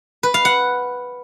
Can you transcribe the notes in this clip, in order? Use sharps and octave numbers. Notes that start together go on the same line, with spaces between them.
B4
F5
F#5